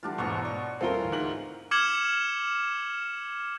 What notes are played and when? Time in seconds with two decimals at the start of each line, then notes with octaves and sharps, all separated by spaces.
0.03 D3 E3 G3 D4 F4
0.18 E2 G#2 B2 F3 F#3 C#6
0.45 D5 C#6
0.81 D#1 C4 E4 F4 A4 A#4 C6 G7
1.00 D2 E3
1.12 G#2 F#7
1.71 D6 F6 G#6 C#7 E7 F#7